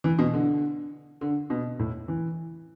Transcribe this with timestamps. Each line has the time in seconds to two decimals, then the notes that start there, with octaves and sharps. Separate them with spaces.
0.04 E3
0.19 B2
0.33 D3
1.21 D3
1.50 B2
1.79 A2
2.08 E3